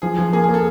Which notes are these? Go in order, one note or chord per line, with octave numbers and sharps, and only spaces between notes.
F3 G#4
F3
A#3 G#4
A#3 G#4
A4